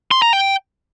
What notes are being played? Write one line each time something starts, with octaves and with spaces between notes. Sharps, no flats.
C6
A#5
G5